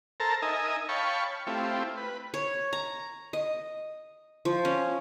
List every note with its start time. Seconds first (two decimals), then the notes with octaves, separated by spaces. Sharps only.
0.20 A4 A#4 C5 A5 A#5
0.42 D#4 A#4 D#5 E5 G#5
0.89 C#5 F5 G5 A5 B5 C#6
1.47 A3 C4 E4 F4 G4
1.97 B4
2.34 C#5
2.73 A#5
3.33 D#5
4.45 F3
4.65 C#4